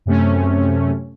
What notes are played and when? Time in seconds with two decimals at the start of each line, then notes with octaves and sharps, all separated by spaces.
0.06 F#2 C3 A3 C#4